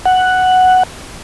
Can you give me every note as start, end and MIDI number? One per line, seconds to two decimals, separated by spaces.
0.06 0.83 78